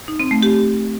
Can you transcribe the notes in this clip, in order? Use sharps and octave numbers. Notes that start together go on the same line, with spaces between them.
D#4
C4
A3
G4